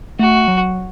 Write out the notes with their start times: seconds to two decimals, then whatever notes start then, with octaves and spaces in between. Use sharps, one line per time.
0.19 A3 F#4
0.48 F#3